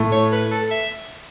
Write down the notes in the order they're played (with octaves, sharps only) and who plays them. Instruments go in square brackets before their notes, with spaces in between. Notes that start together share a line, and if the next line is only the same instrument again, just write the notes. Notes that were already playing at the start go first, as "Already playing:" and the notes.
Already playing: [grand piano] A2 A3
[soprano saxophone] C#5
B4
A4
E5